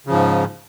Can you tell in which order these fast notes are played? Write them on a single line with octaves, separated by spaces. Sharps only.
C#3 F3 G#2